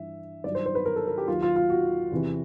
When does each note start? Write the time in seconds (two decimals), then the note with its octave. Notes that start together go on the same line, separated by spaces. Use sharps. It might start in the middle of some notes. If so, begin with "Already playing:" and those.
Already playing: G2 E3 E5
0.44 G2 D#3 F#3 D5
0.55 C5
0.66 C5
0.75 B4
0.85 A#4
0.96 A4
1.07 A#4
1.18 G4
1.28 D#2 D#3 F#3 F4
1.42 F4
1.56 F4
1.70 F#4
2.11 E2 C3 E3